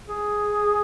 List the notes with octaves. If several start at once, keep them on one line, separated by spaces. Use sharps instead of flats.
G#4